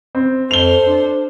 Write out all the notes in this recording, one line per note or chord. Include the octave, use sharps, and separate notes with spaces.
C4
F2 A4 C5 F7 G7
D4